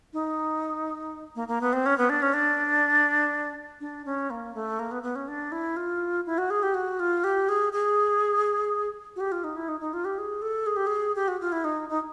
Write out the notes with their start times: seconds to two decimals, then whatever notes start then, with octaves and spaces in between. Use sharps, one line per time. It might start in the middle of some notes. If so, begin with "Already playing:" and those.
0.13 D#4
1.36 A#3
1.48 A#3
1.61 B3
1.73 C4
1.86 C#4
1.98 B3
2.09 D4
2.22 C#4
2.34 D4
3.80 D4
4.05 C#4
4.30 A#3
4.54 A3
4.79 A#3
4.91 B3
5.03 B3
5.15 C#4
5.28 D4
5.52 E4
5.76 F4
6.26 E4
6.38 F#4
6.50 G#4
6.63 G4
6.74 F#4
6.99 F4
7.24 G4
7.49 G#4
7.73 G#4
9.16 F#4
9.20 G4
9.32 F4
9.44 D#4
9.56 E4
9.68 D#4
9.80 D#4
9.93 F4
10.05 G4
10.18 G#4
10.42 A4
10.66 G#4
10.76 G4
10.87 G#4
11.15 G4
11.28 F#4
11.41 F4
11.52 E4
11.64 D#4
11.89 D#4